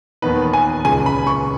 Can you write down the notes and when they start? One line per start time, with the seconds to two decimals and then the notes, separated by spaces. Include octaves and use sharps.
0.22 D#2 D#3 B3 D#4 B4
0.53 G#5
0.85 C#2 C#3 G#3 G#5
1.06 B5
1.27 C#6